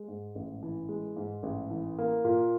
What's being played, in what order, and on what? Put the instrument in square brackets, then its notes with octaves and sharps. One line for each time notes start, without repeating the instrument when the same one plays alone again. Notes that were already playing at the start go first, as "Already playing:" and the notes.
Already playing: [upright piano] G#3
G#2
A1
E3
G#3
G#2
A1
E3
A#3
A#2